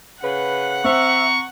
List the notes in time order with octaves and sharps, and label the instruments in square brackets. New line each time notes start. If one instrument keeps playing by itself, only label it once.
[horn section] C#3 B4 [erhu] F#5
[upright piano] C4 [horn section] E5 [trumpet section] A#5 C#6